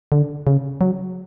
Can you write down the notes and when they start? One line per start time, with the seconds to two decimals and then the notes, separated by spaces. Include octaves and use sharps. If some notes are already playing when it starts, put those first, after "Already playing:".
0.12 D3
0.47 C#3
0.81 F#3